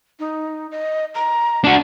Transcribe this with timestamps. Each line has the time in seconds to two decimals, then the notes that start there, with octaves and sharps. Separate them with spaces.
0.19 D#4
0.71 D#5
1.15 A#5
1.64 D4 F#4